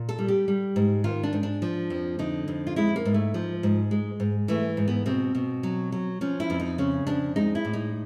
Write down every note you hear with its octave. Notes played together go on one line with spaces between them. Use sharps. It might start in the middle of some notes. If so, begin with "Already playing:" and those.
Already playing: A#2
A4
G3
G4
G3
G#2
D#3 F4
D4
G#2
D4
F3
F2
D3 D#4
F2
F4
G#3 E4
A#3
G#2
A3
F3
G#2
G#3
G#2
E3 A3
G#2
B3
B2 C4
B2
F#3
F#3
F3 C#4
E4
F2
D#4
C#3 C#4
F2 D4
G#3 D#4
E4
A2
D#4